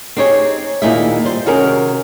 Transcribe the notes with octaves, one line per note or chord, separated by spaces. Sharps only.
C4 D#4 G4 G#4 C#5
D#2 A#2 D#4 E4 G#4 E5
G3 C5
C3 D#3 C#4 F#4 G#4 A#4